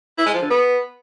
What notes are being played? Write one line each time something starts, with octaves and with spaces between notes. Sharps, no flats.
E4
G#3
F3
D3
B3